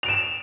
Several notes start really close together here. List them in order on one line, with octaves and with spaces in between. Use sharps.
F7 D7 E7